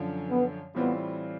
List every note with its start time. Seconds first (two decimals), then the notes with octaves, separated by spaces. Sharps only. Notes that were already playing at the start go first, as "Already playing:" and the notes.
Already playing: F#2 D3 F3
0.30 B3
0.75 A2 E3 G3 B3 C4 F4